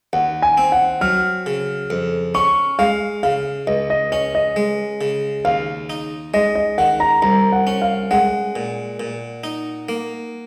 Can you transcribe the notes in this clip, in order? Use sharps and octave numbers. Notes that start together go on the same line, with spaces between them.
D#2 F#5
G#5
C4
F#5
F#3 F6
C#3
F2
C#4 C#6
G#3 F5
C#3 F5
C#2 D#5
D#5
C#4 D#5
D#5
G#3
C#3
D#2 F5
D#4
G#3 D#5
D#5
D#3 F#5
A#5
C2 A#5
F#5
C#4
F5
G#3 F#5
A#2
A#2
D#4
A#3